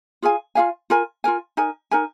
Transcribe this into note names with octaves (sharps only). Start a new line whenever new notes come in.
F4 G#4 F5 G#5
F4 G#4 F5 G#5
F4 A#4 G#5
F4 A#4 G#5
D#4 A#4 G#5
D#4 A#4 G#5